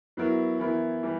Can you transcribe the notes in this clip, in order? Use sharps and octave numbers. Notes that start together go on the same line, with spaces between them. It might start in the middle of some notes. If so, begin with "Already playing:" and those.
F#3 B3 E4 A#4
E3 B3 E4 A#4
E3 G3